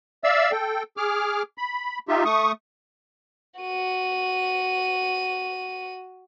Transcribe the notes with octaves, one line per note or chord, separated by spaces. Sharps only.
D5 E5 F5 E6
A4 G5
G#4 D6 F6
B5
D#4 F4 G4 E5
A3 C#6 D#6
F#4 D#7